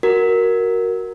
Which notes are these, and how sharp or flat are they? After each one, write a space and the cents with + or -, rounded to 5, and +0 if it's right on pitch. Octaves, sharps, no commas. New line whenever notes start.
F#4 +0 A#4 +0